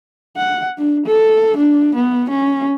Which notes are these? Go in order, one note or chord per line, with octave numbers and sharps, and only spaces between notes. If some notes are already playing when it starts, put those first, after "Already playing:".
F#5
D4
A4
D4
B3
C#4